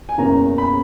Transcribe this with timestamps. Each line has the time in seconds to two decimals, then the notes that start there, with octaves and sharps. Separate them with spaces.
0.09 G#5
0.18 F#1 E2 B2 A#3 C#4 A#5
0.58 B5